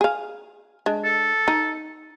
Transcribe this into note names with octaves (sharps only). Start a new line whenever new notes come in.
G#4 F5
G#3 D4
A4
D#4